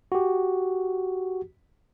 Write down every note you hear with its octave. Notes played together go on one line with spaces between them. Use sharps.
F#4 G4